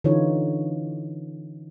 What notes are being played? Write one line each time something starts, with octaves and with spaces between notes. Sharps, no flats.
D3 E3 C#4 D#4 F4 C#5